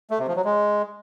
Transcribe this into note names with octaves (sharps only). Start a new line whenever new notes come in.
A3
C3
F3
F#3
G#3